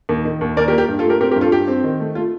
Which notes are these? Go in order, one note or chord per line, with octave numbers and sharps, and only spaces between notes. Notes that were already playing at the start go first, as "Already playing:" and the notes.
D#2
D#3
D#2
D#2 A#4 D5
G4 A#4
A#3
G4 A#4
G2
F4 A4
A3 G4 A#4
C4 G4 A#4
G4 A#4
G2
F4 A4
G2 G4
C4
D#3
A3
A3 F4